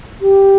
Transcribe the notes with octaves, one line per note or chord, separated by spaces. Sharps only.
G4